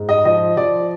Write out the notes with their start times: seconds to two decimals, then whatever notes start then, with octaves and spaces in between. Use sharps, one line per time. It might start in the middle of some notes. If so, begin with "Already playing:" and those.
Already playing: G#2
0.09 D#5
0.25 F3 D#5
0.57 F3 D5